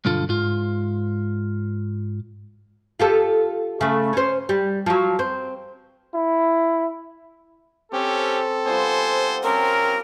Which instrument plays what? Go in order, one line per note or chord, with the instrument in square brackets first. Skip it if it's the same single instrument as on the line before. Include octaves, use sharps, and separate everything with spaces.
[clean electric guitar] B1 G2 D3 F4 A4
G#2 F4
[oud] F4 G4 A4
C#3 A3
C#4 C5
G3
F3 F#3
C4
[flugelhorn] E4
[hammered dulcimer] C4 [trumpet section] C#4 G4 [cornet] A4
[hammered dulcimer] F3 G3 B3 [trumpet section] C5 G#5
[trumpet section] C4 C#4 [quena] A#4 [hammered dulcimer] D5 C6 D6